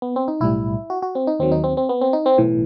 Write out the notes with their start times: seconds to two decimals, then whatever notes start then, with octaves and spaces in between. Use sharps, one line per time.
0.02 B3
0.16 C4
0.28 D#4
0.40 B1 A2 G3 E4
0.90 F#4
1.02 F#4
1.15 C4
1.27 D#4
1.39 D#2 D#3 F#3 C4
1.52 D#4
1.64 C4
1.77 C4
1.89 B3
2.01 C4
2.13 D#4
2.26 C4
2.38 B1 A2 E3